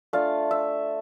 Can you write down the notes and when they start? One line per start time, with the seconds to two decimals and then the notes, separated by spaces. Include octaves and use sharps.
0.13 A3 D4 F4 F5
0.51 E5